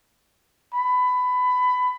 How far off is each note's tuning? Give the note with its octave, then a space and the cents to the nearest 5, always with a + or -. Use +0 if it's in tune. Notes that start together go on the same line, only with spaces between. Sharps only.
B5 +20